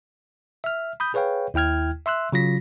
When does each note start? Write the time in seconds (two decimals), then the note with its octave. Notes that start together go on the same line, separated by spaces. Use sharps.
0.64 E5 F6
1.00 B5 D#6 G6
1.14 G#4 B4 C#5 F5 G5
1.54 D#2 E4 G5 F6 G#6
2.06 E5 C6 E6 F#6
2.32 C#3 F#3 F4 A#6 B6